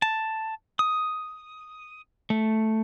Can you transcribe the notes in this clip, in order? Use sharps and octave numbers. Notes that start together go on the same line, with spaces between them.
A5
D#6
A3